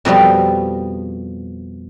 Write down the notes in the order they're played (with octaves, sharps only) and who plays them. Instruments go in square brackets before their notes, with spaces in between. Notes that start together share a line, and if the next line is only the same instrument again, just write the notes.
[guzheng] F2 B2 F3 G3